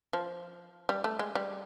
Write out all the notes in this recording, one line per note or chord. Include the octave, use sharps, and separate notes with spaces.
F3
G3
A3
G#3
G3